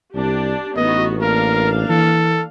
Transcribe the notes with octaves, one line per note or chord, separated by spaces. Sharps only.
C2 D4 G4
A1 B3 D#4 F#4 D#5
A#3 D4 A#4 F5
E3 A4